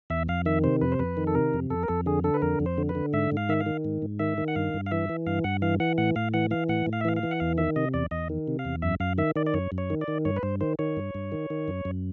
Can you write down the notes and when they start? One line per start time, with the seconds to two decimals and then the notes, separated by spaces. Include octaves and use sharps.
0.10 E2 E5
0.29 F2 F5
0.46 D#3 E5
0.64 C3 C5
0.81 F2 B4
0.92 C5
0.99 F2 B4
1.17 D#3
1.27 A4
1.35 C3 A#4
1.54 F2
1.70 F2 A4
1.83 A#4
1.88 F2 A4
2.06 D3 G#4
2.24 D3 A4
2.34 B4
2.42 F2 A#4
2.60 F2
2.66 C5
2.78 D3
2.89 B4
2.95 D3
3.13 G#2 E5
3.32 G#2
3.37 F5
3.49 D#3 E5
3.60 F5
3.66 D#3
3.85 G#2
4.02 G#2
4.19 D#3 E5
4.38 D#3
4.48 F#5
4.56 G2 F5
4.74 G2
4.86 F5
4.91 E3 E5
5.09 E3
5.27 G2 F5
5.44 G2 F#5
5.62 E3 F5
5.80 E3 F#5
5.98 A2 F#5
6.16 A2 F5
6.34 E3 F#5
6.51 E3 F5
6.69 A2 F#5
6.87 A2
6.93 F5
7.01 E5
7.05 E3 F5
7.16 F5
7.23 E3
7.31 F#5
7.40 E2 F5
7.58 D#3 E5
7.76 C3 D#5
7.94 E2 D5
8.11 E2 D#5
8.29 D#3
8.48 C3
8.59 F5
8.65 E2
8.82 F#2 E5
9.00 F#2 F5
9.18 D#3 E5
9.36 D#3 D5
9.46 D5
9.54 F#2 C#5
9.72 F#2
9.78 C#5
9.90 D#3
10.01 D5
10.08 D#3
10.25 G2 C#5
10.36 B4
10.43 G2 C5
10.61 D#3 C5
10.79 D#3 C#5
10.97 G2
11.15 G2
11.32 D#3
11.50 D#3
11.68 F#2
11.85 F#2